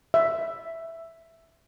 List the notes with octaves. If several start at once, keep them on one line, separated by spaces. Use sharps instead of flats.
E5